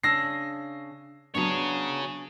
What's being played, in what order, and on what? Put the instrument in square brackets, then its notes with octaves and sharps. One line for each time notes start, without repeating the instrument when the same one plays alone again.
[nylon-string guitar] C#3 D4 [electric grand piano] E6 A#6 C7
[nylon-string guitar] F#3 B3 D4 [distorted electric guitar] G#4 C#5